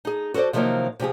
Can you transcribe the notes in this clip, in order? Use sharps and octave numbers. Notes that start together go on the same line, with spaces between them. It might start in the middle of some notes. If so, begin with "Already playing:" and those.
D#4 G#4
F#4 A4 A#4 C5 D5
C3 D#3 F3 F#3 A#3 D#4
C3 F3 G4 G#4